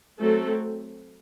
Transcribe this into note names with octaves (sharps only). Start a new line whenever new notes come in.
F#3 A3 C4 A4